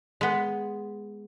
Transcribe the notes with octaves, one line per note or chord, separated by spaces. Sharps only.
G#3 B3